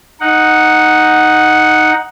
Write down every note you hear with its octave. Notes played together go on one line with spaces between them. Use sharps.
D#4 F#5